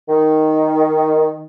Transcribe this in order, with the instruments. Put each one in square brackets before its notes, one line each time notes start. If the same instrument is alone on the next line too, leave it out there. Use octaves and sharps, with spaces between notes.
[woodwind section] D#3